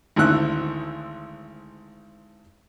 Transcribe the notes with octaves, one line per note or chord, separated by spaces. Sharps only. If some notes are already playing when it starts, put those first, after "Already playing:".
G#1 D2 A2 E4 F#6